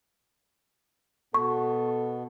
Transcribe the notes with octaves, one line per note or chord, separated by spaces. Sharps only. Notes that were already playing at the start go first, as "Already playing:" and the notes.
B2 B3 A4 C#6